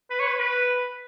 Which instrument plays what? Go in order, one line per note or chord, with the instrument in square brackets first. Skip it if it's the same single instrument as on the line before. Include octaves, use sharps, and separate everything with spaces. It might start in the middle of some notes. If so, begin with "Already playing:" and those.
[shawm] B4
C#5
B4
B4